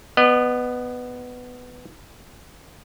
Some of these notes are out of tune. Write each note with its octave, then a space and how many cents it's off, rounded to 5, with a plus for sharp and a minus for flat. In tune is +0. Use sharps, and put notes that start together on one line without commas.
B3 +10 D#5 -35